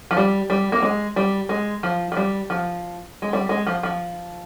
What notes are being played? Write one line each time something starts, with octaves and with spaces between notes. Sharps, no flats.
F3
G3
G3
A#3
G#3
G3
G#3
F3
F3
G3
F3
G#3
G3
G#3
F3
F3